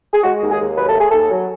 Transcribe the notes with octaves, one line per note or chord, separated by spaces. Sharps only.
G#4
G#3 F#4
D#2
G#4
D#2
F#3 B4
A4
A3 G#4
D#2 A4
F#3